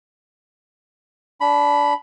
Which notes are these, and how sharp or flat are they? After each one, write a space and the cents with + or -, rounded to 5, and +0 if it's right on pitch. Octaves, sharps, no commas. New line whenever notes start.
D4 -20 B5 +0